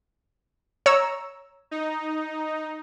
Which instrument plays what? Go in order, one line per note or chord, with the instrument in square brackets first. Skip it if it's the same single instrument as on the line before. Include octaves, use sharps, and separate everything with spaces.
[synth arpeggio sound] C#5 A#5 E6
[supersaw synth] D#4